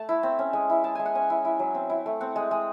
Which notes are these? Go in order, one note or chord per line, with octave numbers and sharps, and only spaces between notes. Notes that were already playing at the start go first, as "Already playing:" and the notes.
Already playing: A3 A5
E4
C4
C#4
G#3
E4
G#3 A5
G#3 G#5
F#5
C#4 G#5
E4
E4
F#3
C4
E4
A3
C4 F#5
G#3
G#3